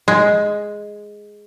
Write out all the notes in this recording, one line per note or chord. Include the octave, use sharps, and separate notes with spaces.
G#3